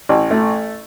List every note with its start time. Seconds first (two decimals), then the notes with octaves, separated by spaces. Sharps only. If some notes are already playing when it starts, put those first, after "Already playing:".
0.09 A1
0.31 A3